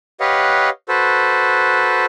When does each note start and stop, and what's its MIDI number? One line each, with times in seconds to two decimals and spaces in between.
0.20 0.69 67
0.20 0.69 71
0.20 0.69 73
0.20 0.69 75
0.20 0.69 77
0.20 0.69 78
0.89 2.06 66
0.89 2.06 69
0.89 2.06 71
0.89 2.06 72